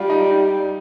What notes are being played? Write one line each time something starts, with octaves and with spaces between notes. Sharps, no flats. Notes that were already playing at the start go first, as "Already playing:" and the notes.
Already playing: G3 D4 F4
D#4
D#4